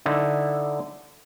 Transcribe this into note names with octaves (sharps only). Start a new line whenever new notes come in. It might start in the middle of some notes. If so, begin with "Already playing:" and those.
D3 D#4 E4